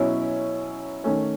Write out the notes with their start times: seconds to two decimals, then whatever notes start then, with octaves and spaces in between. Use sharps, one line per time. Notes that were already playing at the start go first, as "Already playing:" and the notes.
Already playing: B2 F#3 C#4 E4
1.04 D#3 A3 C#4